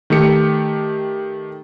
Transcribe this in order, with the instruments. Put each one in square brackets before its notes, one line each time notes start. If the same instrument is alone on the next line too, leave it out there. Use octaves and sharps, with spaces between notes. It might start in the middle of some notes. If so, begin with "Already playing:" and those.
[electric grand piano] D#3 A3 G4 C#7